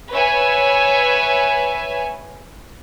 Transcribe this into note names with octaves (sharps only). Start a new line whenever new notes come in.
B4 C#5 E5 G#5